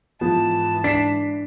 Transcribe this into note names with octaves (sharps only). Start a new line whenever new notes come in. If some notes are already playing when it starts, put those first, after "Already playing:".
G#2 E3 F3 B3 A5
D4 B6 C7